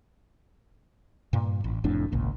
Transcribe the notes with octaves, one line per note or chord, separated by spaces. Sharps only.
G2 A#2
A1
F1 F2 A2 D4
G#1 C#2 A#2